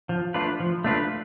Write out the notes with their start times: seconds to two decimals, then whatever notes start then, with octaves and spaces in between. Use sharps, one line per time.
0.09 F3
0.34 A3 D4 F4 B4
0.60 F3
0.84 A3 D4 F4 B4